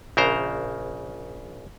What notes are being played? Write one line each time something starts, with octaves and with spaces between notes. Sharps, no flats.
A#1 C#3 A#4 C5 A#5